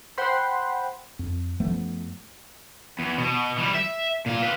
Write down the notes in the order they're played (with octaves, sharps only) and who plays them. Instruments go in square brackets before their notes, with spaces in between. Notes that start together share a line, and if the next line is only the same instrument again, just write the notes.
[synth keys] C5 F#5 G5 B5 C6
[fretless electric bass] F2
F#2 F3 A3 B3
[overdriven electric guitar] E2
B2
E3 G3
E5
A#2 F5
F4 B4